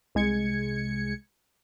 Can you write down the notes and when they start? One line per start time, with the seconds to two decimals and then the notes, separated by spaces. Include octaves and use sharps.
0.15 C2 G#3 G#6 C#7